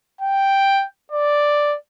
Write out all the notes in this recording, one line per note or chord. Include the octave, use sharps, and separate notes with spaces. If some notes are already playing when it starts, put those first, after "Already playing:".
G5
D5